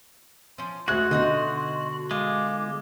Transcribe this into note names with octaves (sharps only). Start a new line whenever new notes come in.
F3 C#4 C6
D2 G#3 A3 F#4 F#6 G#6
B2 D3 D#4 D#5 F#5
G#3 F4 D6